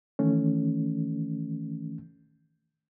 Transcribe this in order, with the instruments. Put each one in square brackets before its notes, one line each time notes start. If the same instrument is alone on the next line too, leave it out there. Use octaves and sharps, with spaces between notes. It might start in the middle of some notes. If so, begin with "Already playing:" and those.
[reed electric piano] D#3 E3 A3 C#4